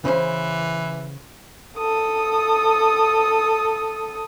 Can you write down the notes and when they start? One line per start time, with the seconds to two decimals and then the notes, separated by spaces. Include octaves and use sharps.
0.05 C#3 E3 C#4 C5
1.77 A4 D#6